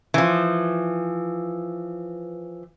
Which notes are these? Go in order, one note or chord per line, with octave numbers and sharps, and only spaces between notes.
E3 F3